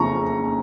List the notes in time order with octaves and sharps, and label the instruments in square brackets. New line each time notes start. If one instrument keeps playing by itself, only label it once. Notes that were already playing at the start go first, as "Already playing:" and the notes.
Already playing: [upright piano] F#1 F2 C#3 F3 A#5 C#6